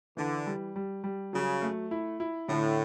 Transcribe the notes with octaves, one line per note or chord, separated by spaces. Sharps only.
D3 E3
G3
G3
G3
C#3 F#3
A3
E4
E4
A2 D3